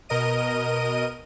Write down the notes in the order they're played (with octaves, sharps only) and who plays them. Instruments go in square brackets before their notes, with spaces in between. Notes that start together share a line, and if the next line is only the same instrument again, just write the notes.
[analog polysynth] B2 A#4 D#5 D#7